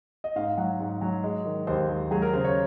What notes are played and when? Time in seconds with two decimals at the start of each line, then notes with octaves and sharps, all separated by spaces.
0.24 D#5
0.36 G#2 F5
0.58 F#3 F#5
0.80 G#2
1.01 F#3
1.24 G#3
1.45 D#3
1.67 D#2 C5
1.89 D#2
2.11 F#3 G#4
2.22 A#4
2.33 C#3 C5
2.45 C#5